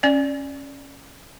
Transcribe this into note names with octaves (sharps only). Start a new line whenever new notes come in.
C#4 D5